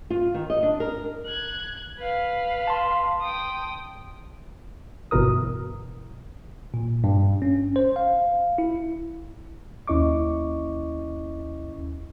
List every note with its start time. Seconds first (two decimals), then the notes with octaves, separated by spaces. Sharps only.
0.10 F4
0.34 D#3
0.50 D#5
0.63 D4
0.80 A#4
1.26 F#6 G#6
1.99 B4 F5
2.67 A5 C6
3.21 G5 D#6
5.11 G1 B2 E3 A#4 D#6
6.74 A#2
7.04 G2
7.42 C#4
7.76 C5
7.96 F5
8.58 E4
9.88 D#2 C#4 E4 D#5 C#6 D6